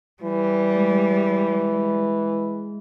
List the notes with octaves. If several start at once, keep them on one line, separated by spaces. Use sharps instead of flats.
E3 G3
G#3